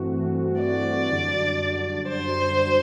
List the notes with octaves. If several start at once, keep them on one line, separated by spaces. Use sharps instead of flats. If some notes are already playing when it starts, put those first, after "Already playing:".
Already playing: G2 E3 A3 C4 F#4
D5
F#2 D3 G3 D4 F#4
C5